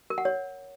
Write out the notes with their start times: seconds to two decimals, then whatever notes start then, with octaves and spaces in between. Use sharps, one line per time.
0.10 A#4
0.18 F#5
0.25 C#5